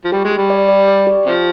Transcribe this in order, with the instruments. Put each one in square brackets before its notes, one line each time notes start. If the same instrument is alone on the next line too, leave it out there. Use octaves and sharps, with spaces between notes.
[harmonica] F3
[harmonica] G3 [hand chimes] G4
[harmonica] G#3
[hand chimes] G4
[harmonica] G3
[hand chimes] D5
D5
D5
G4
[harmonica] C3 F3 [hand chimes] G4